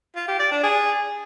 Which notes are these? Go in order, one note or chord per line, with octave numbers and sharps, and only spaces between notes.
F4
G4
D5
D4
G#4